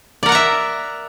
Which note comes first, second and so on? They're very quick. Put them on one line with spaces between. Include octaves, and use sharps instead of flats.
D5 A#4 F#5 A#5 E5